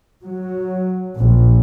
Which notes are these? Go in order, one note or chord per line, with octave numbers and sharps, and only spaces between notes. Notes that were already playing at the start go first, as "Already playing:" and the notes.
F#3
A#1